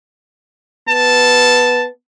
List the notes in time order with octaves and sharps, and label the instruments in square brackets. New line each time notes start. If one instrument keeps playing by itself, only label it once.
[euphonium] B3 [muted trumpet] A5